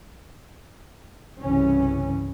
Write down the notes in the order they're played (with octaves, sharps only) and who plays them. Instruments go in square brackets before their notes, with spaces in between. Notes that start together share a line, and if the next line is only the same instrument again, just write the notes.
[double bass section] C2 G2 C#3 E3 C#4